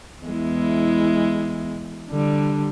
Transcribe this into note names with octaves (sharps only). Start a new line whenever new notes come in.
E2 G#3 E4
D3 G3